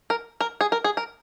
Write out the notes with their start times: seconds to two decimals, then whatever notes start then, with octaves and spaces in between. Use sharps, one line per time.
0.10 A#4
0.41 A#4
0.61 G#4
0.72 A#4
0.84 G#4
0.97 A#4